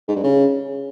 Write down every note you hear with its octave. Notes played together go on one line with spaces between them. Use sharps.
G#2
G2
C#3